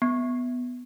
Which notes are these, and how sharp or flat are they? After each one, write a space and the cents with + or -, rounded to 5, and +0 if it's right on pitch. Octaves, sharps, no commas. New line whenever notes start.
B3 +5